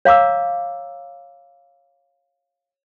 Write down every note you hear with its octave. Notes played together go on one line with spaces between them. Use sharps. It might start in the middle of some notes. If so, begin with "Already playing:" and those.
C#5 F5 A#5 D6 E6